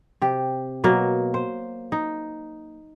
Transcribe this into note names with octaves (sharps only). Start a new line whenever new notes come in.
C3 G4
B2 F#3 A#3
C5
D#4